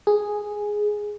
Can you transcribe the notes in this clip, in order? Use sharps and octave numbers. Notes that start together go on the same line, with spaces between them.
G#4